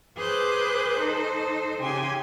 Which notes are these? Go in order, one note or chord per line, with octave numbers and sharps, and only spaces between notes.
G#4 B4 C5 D6 F#6 G6
D#4 A4 C5
C#3 G4 G#5 C6